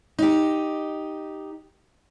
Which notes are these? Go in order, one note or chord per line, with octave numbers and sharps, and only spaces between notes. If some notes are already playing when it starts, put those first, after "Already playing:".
D#4 G4